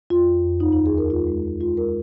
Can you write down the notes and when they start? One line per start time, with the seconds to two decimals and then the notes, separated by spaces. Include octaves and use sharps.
0.10 F2 F4
0.28 F2
0.44 F2
0.60 D#2 D#4
0.73 D#4
0.77 D#3
0.86 G#4
0.94 D#2 A#4
1.10 G#3 F4
1.28 G#3
1.44 G#3
1.61 G#3 F4
1.77 G#3 A#4